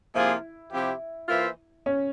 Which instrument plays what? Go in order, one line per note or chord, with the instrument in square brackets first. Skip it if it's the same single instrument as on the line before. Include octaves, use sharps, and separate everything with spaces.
[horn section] C3 F3 A#3 F4 G#4 [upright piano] E4
[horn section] C3 F3 C4 E4 G4
E3 A#3 F4 C5 E5
[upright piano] C#4